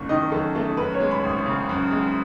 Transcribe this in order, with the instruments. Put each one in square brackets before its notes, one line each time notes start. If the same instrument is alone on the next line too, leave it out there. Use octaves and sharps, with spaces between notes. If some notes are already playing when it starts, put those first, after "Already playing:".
Already playing: [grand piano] F#1 F#2 A3 [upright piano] C#6
[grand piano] D#3 [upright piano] D#5
[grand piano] F#2 [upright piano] A4
[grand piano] A3 [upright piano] A4
[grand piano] F#2 [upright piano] B4
[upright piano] C#5
[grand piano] G#3
[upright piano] B5
[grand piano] G#1
[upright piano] C#6
[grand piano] C#3
F#2
G#3